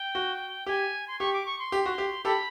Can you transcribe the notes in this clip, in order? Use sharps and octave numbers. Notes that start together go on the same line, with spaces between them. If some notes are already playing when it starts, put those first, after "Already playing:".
Already playing: G5
F#4
G4 G#5
C6
G4 C#6
D6
C#6
C6
G4
F#4
G4
G4 A4 B5